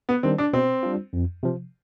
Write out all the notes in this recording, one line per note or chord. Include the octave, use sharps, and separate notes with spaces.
B3
D#3 G3 C4 D4
D4
B2 C4
G3 D4 F4
F2
C3 F3